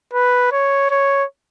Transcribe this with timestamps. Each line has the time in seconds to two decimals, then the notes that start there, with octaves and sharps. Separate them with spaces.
0.14 B4
0.52 C#5
0.90 C#5